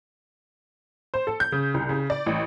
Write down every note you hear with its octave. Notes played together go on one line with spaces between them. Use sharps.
C5
A4
G6
C#3
C2
C#3
D5
A1